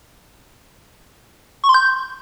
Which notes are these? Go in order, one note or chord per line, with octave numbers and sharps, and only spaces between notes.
C#6
C6
G6